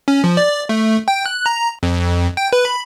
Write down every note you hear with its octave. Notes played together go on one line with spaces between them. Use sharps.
C#4
F3
D5
A3
G5
F#6
A#5
F2
G5
B4
B5